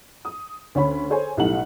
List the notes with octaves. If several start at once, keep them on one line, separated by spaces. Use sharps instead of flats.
D#6
D2 C#4 C#5 B5
G#4 A4 C5 C#5 G#5
B1 A2 G3 A4 F#5 F#7